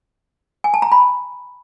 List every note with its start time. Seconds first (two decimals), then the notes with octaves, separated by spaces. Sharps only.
0.64 G#5
0.74 A5
0.82 A#5
0.92 B5